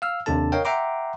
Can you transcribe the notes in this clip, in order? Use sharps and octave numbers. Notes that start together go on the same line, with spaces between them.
F5 E6 F6
D#2 C3 D4 A4 A5
A#4 C#5 D#5 F5 G5
E5 F#5 G5 A#5 C6 D6